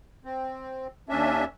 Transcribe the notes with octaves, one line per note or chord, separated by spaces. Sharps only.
C4
D#2 C#4 D4 E5